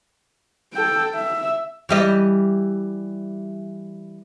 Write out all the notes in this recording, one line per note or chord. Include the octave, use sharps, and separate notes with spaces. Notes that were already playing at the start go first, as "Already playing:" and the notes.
A4 G5
E5
E3 G3 D#5